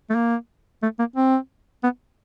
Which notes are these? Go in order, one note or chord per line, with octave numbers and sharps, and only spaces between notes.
A3
A#3
A3
A#3
C4
B3